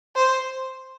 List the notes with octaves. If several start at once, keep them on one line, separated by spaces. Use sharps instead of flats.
C5